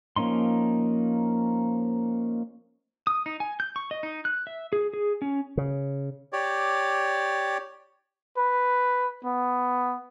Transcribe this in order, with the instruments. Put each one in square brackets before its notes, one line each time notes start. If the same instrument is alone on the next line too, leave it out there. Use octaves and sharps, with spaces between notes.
[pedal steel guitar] F3 A#3 C#4 D#4 C6
D#6
D#4
G#5
G6
C#6
D#5
D#4
F#6
E5
G#4
G#4
C#4
[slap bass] C#3
[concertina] G4 C#5 D5
[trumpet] B4
B3